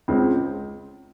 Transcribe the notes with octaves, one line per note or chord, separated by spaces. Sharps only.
C#2 C#3 G#3 C4